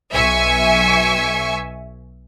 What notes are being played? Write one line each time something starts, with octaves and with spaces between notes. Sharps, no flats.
B1 E5 G#5 C#6